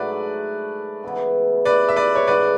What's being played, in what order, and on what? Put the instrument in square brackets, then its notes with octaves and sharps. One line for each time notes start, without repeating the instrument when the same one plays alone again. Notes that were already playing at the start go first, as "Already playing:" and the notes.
Already playing: [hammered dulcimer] G#2 F#3 A3 D4 [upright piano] B4 D5
[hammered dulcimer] C#3 E3 B3 E4
[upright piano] B4 D5
E5
B4 D5
C#5
[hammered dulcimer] G#2 E3 A3 C#4 [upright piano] B4 D5